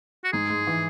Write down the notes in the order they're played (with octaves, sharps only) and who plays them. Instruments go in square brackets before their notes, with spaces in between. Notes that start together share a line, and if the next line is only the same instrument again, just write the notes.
[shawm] F#4
[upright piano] G#2 [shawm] G#4
[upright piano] G#3
E3